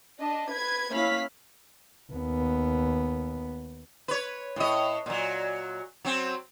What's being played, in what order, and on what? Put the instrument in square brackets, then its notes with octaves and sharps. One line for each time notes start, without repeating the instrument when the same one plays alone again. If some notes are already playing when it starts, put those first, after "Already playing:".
[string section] D4 D#5
B4 G#6
A#3 C#4 E4 F5 B5 B6
[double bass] D#2 B3
[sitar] B4 C#5
A2 D#5
A#2 F#3
F#3 C4